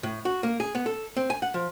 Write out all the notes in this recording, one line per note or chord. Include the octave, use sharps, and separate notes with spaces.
A2
F#4
A#3
G#4
B3
A4
C4
G#5
F#5
F3